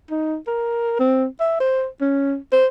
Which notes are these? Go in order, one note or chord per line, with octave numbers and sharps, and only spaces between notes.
D#4
A#4
C4
E5
C5
C#4
C5